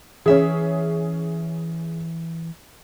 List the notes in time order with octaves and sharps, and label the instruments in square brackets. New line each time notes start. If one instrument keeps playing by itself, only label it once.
[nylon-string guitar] E3 E5 [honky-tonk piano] C#4 G#4